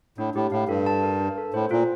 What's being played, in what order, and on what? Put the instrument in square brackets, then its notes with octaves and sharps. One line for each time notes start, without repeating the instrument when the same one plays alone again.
[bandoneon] A2 [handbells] D4
[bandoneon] A2 [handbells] G4
[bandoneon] A2 [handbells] F5
[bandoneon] G2 [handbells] A4
[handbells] A5
A#4
D4
A4
[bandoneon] A2 [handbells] C5
[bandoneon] A#2 [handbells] F4